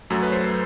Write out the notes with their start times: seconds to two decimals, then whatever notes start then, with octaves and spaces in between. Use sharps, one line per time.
0.10 F#2 F#3 A3 A4
0.22 B4
0.32 C5